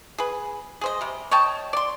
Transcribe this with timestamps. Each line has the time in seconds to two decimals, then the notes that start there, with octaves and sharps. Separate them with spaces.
0.18 G#4 B4
0.81 G#4 C5 D#5
1.01 C3 G3
1.31 C#5 D#5 G5 A5
1.73 D5 C6